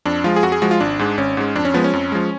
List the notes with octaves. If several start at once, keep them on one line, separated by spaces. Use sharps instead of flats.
F2 D4
F3 G#3 F4
G#4
F2 F#4
G#4
F3 G#3 F#4
F4
G#1 D4
G#2 G#3
G#1 C#4
G#2 G#3
F2 D4
C#4
F3 G#3 B3
C#4
F2
F3 G#3